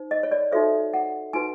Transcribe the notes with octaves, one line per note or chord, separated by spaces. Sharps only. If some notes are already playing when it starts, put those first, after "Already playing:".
Already playing: D#4 C5
D#5
C#5
D5
D#4 F#4 A4 C5 E5
F#5
D#4 F#4 B4 G#5